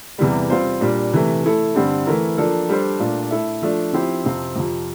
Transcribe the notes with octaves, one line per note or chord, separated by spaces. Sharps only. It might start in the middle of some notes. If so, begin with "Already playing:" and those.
E2 C3 E3 G3
G3 C4 F4 C5
A#2 G3 D4
C3 E3 A3
A3 E4 A4
G2 D3 G3 C4
E3 A3 E4 A#4
F3 A#3 D4 A4
G3 D4 A4 C5
A#2 A3 D4 F4
A3 E4 A4 E5
F3 A3 D4
F3 C4 E4 G4 C5
F2 C3 F3 C4 F4
F2 C3 F3